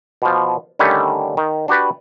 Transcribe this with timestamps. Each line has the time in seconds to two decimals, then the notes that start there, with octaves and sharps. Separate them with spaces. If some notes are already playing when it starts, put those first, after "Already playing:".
0.22 B2 F3
0.79 D3 D#3 G3 A3 C#4
1.37 D#3
1.68 D4 F#4 G4 B4 D5